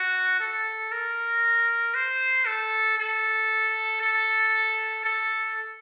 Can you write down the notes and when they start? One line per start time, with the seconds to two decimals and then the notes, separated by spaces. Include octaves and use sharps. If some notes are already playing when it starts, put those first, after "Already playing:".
Already playing: F#4
0.40 A4
0.92 A#4
1.95 C5
2.46 A4
2.98 A4
4.01 A4
5.04 A4